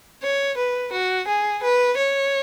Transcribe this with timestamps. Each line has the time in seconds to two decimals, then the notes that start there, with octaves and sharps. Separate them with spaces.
0.23 C#5
0.57 B4
0.92 F#4
1.27 G#4
1.63 B4
1.97 C#5